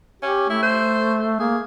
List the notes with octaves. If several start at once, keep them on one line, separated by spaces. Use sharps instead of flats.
C#4 G4
A3 E4
C5
A#3 G#4